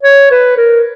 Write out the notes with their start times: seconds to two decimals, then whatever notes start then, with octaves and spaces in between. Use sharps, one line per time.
0.03 C#5
0.31 B4
0.57 A#4